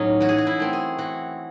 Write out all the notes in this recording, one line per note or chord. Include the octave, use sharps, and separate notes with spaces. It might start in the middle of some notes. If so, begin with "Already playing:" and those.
Already playing: A2 F#3 C#4 D#4
E3 F#4
G#4
F#4
E4
A3 C4
G#4
E3 F#4